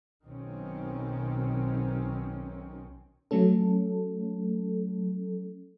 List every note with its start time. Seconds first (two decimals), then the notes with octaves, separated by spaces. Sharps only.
0.23 B1 D#3 C4 C#4
3.31 F#3 A3 C#4 A4